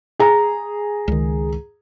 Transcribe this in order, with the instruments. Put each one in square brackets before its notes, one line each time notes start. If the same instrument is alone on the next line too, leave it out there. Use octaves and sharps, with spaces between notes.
[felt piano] G#4 A#5
[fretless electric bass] C#2 D#3